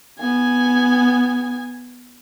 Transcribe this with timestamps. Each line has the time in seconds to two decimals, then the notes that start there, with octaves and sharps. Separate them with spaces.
0.19 B3 G#5